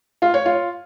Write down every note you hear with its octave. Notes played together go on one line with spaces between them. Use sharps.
F4
C#5
F4